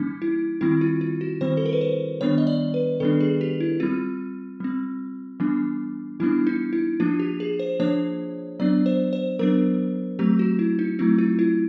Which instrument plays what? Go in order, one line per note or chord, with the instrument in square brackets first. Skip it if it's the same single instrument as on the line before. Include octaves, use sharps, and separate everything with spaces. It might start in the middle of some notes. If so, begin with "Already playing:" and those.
Already playing: [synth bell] E3 G3 A#3 C#4 D#4
E4
D#3 G3 C4 E4
F4
F4
F#4
D#3 G3 C4 C5
A4
A#4
B4
C5
D#3 G3 B3 D4 C#5
D#5
D5
B4
D#3 G3 B3 D4 A4
G#4
G4
E4
G3 C4 F4
G3 C4
E3 G3 B3 D4
E3 G3 B3 D4 E4
D#4
E4
F3 A#3 D4 F4
G4
G#4
C5
F3 A#3 D4 C#5
F#3 B3 D4 D5
C5
C5
F#3 B3 D4 A#4
F#3 A3 C4 G4
F#4
E4
D#4
F#3 A3 C4 E4
F4
E4